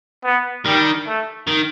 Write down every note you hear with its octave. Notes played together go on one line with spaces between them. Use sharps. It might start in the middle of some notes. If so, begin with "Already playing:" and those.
B3
D#3 G3
A3
D#3